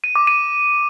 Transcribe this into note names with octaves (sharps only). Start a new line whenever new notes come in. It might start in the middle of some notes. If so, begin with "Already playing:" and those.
D#7
D6
D#7